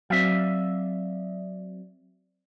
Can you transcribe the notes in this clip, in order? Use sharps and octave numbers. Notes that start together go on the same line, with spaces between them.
F#3 C4 D5 E5 F5